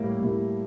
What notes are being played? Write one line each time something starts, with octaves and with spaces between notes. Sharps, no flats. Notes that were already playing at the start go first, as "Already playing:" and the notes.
Already playing: A2 G3 A#3 E4
A2 G3 A#3 E4